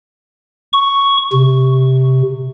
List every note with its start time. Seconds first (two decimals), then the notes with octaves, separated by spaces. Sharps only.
0.73 C#6
1.33 C3